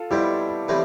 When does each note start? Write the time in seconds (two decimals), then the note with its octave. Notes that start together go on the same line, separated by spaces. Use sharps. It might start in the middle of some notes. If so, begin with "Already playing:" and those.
Already playing: F4 A4
0.11 B2 G3 C4 E4 G4
0.68 A2 E3 G3 C4